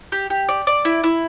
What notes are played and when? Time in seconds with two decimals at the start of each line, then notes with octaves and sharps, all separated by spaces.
0.12 G4
0.30 G4
0.49 D5
0.67 D5
0.85 E4
1.04 E4